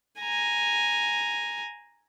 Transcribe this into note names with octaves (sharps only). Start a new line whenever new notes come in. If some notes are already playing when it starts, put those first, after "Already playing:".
G#5 A#5